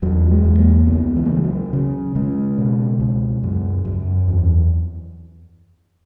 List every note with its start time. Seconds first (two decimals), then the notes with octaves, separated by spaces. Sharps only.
0.02 E2 F#3
0.31 G#3
0.45 E2
0.59 A#3
0.87 C#2 B3
1.16 E3
1.26 A#3
1.30 C#3 G#3
1.44 F#3
1.73 C#3
2.15 C#3 G#3
2.58 B2
3.00 C#2
3.43 F#2
3.85 F#2
4.28 E2